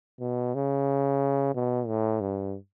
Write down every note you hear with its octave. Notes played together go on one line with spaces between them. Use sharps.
B2
C#3
B2
A2
G2